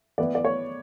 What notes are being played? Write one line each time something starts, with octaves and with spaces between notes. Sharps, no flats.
E3 B3 E4 D5
D5
C#5